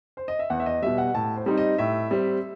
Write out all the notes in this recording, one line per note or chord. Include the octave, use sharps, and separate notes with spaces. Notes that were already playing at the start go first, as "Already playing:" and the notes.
C5
D#5
E5
E2 F#5
E5
D#5
B2 G3 E5
F#5
A2 A5
C5
G3 C4 D#4
D#5
A2 E5
G3 C4